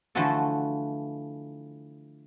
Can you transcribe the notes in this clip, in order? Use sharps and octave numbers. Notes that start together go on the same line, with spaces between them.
D3 E3 F3 A3 F#4 A4